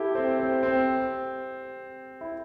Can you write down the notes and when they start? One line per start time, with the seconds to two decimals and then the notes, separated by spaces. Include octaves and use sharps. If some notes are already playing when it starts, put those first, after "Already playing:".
Already playing: E4 G4 A4
0.15 C4
0.40 C4
0.63 C4
2.21 E4